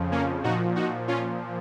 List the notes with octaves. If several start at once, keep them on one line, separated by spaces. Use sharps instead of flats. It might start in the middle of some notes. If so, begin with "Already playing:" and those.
Already playing: F2 C#3 F3
A#3 C#4
A#2 F3 D#4 F#4
D#4 F#4
C#4 F4